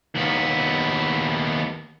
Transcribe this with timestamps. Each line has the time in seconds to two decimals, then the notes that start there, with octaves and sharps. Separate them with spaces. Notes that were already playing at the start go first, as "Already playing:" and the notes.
0.15 D#2 B3